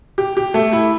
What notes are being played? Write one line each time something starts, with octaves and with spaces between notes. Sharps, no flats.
G4
G4
A3
E4